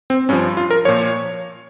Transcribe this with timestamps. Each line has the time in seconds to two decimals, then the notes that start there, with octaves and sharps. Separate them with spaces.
0.10 C4
0.29 G2 F3 C#4
0.57 F4
0.71 A#4
0.85 A#2 F3 C#5